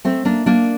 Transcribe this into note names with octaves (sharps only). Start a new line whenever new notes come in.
A3 C4
A#3 D4
A#3 D4